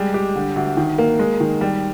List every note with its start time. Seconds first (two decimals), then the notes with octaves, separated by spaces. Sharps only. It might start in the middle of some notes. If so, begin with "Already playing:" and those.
Already playing: G3 G#3
0.14 G4
0.36 D3
0.56 D2
0.77 D#3
0.98 A#3
1.19 G#3
1.40 D#3
1.61 G3